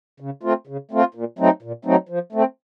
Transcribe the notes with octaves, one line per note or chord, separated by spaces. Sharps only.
C#3
A3 C4 F4
C#3
A3 C4 F4
A#2
F#3 A3 C4 D#4
A#2
F#3 A3 C4 D#4
F3
A3 C4